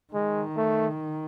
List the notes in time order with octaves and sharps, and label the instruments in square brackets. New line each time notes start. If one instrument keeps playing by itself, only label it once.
[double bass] D#3 [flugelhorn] G#3
[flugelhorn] A3